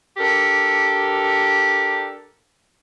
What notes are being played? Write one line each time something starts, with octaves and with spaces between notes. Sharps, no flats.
D4 G4 A4 A#4